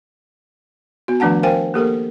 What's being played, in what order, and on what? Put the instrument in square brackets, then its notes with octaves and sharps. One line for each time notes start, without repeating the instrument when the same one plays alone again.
[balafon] B3 F#4
D#3 F3 A3 D4 F#5 A5
A#4 C5 F5 G5 G#5
A#3 G4 A4 A#4